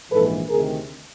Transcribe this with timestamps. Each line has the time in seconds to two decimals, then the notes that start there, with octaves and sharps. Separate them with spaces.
0.10 A#1 G#2 E3 A4 B4
0.49 D2 C3 D#3 G#4 A#4